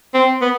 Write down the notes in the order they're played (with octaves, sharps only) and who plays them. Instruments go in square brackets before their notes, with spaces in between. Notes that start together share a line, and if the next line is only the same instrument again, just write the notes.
[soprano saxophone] C4
B3